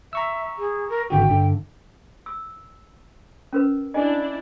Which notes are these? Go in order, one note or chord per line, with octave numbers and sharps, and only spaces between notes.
E5 A#5 C#6 E6
G#4
A#4
G#1 D3 F#4 G5
G2 D3
E6
C#4 A#4 B4
D4 E4 D#5 G#5